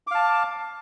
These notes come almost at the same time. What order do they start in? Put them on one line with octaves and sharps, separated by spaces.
D6 F5 A5